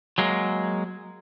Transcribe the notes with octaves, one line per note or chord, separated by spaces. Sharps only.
F#3 G#3 A#3